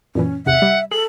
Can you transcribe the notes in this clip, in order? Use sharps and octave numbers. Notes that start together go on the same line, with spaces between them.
F#2 A#2 E3 C#4
G#1 E2 C3 E5 F#5
G3
G#4 A4 F#7